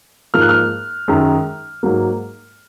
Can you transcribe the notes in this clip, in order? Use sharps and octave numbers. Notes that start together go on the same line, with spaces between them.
G#2 F3 A#3 F6
F#6
F6
F#2 D#3 G#3
G#2 F#3 A#3